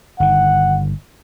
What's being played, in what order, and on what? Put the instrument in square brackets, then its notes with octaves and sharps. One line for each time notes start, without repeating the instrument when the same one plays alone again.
[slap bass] G1 D#3 [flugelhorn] F#5